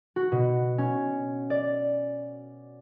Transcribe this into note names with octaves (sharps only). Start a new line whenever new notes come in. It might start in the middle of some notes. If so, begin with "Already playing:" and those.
F#4
B2
C#4
D5